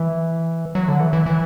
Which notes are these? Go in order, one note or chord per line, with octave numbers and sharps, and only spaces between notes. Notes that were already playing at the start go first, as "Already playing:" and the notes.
Already playing: E3
F#3
D3
E3
E3
E3